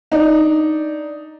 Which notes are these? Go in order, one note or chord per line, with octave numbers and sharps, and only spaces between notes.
D4 D#4